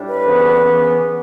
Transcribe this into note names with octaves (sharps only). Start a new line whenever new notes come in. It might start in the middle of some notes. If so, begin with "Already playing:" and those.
Already playing: A2 G3 D4
B4
D2 C#3 E3 B3
C#3 E3 B3